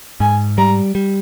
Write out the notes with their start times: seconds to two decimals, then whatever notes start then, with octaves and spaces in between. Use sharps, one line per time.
0.20 G#2 G#5
0.58 G3 A#5
0.95 G3